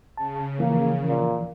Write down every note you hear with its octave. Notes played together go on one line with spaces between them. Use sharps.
C#3 A5
E3 F3 A#3 A#4
A#2